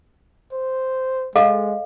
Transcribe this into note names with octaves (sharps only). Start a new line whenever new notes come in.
C5
G#3 A4 D#5 F5